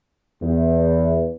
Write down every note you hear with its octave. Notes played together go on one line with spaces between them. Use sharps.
E2